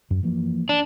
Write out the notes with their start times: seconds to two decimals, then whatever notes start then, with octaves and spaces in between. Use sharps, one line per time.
0.11 F#2
0.23 E3 F3 A#3
0.69 D4